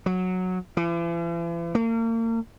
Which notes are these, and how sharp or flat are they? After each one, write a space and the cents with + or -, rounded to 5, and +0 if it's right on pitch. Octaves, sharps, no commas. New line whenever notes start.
F#3 -10
E3 +45
A#3 -40